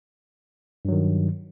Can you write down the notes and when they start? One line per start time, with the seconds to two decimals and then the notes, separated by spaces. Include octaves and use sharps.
0.85 G2
0.89 F#3
0.92 D#3